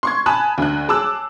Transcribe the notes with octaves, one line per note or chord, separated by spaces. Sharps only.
C6 C#6 G#6
G#5 A5 B5 D#6 F#6
D2 F#6
G#4 A5 D6 E6 F#6